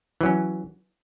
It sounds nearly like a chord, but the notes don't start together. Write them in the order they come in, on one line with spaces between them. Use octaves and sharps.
E3 F#3 C#4